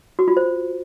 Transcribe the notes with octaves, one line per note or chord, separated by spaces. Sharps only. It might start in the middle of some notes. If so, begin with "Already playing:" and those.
F#4
F4
C5